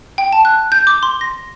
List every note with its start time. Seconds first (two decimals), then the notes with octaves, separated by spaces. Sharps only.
0.18 G5
0.33 A5
0.45 F#6
0.72 G6
0.87 D6
1.03 C6
1.21 A#6